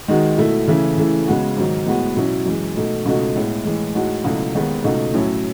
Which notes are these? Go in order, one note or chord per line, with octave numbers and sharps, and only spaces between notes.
D#3 G#3 D#4 F#4
B2 A3 E4
C#3 E3 A3 E4
C#3 E3 A3 E4
C#3 G#3 B3 F#4
G#2 D#3 F#3
A2 G#3 B3 F#4
B2 F#3 C#4 E4
F#2 E3 G#3
B2 A3 D#4
C#2 B2 A3 D#4 F#4
A2 G#3 B3 E4
A2 E3 G#3
A2 G#3 D#4 F#4
C#2 B2 F#3 A3 E4
D#2 D#3 G#3 B3
C#2 B2 A3 D#4 F#4
A2 F#3 C#4 E4